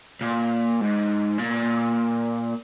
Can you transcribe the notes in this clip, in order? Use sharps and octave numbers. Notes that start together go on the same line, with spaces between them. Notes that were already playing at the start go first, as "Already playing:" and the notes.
A#2
G#2
A#2